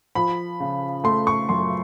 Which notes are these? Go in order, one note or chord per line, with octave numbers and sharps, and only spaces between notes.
F3 B5
C#3
A3 C6
C#6
F#2 C6